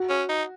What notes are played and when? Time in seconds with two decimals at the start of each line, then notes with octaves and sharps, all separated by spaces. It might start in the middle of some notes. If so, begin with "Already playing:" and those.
Already playing: F#4
0.09 C#4
0.29 D#4